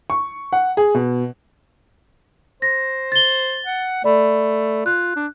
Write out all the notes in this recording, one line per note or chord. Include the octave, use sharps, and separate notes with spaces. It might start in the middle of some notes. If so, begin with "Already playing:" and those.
C#6
F#5
G#4
B2
C5 A#6
A6 G7
F#5
A3 D5 B5
F4 F#6
D4